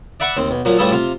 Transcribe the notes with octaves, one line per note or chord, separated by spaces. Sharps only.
D5 E5 F#5 B5 C#6
D#2 C4
B1
A#2 F3 F#3
A1 G2 F3 G3 G#4 A4
C3 F4